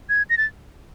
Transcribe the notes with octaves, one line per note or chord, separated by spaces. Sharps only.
G#6
A#6
A6